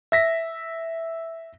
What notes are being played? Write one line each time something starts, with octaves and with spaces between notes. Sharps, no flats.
E5 A#6 B6